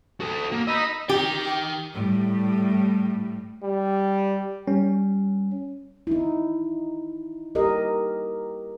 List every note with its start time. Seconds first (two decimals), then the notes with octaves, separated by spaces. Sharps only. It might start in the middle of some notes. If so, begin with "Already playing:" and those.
0.20 F#4 A4
0.52 A#3
0.68 D#5 A#5 B5 D#6 E6
1.09 D#4 G4 G5
1.94 A2 G3
3.64 G3
4.67 G3 C#4
6.07 D#4 E4
7.55 G4 A#4 D#5